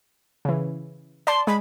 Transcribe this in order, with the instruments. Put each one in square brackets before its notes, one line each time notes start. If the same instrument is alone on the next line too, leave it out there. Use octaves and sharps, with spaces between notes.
[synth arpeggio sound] C#3 E3
[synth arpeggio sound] D5 A5 [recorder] C6
[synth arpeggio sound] G#3 [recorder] B5